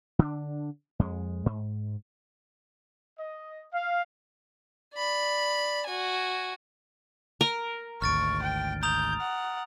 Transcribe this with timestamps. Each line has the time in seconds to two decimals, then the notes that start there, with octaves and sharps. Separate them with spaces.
0.19 D3 D4
0.99 F2 G#3
1.46 G#2
3.17 D#5
3.72 F5
4.95 D5 B5
5.87 F#4 G#5
7.41 A#4
8.02 G#1 D2 C#6 F6 A6 D7
8.42 G5
8.83 A#5 D#6 G6 F7
9.21 F#5